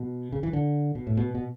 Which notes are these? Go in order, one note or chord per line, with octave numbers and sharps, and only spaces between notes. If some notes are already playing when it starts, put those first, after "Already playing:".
Already playing: B2
C#3
E3
D3
B2
A2
B2
B2